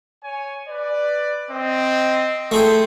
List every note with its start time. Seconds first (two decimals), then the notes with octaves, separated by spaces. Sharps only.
0.23 C#5 G#5
0.67 B4 D5
1.51 C4 D#5
2.51 A3 E4 G#4 A4 G5 C6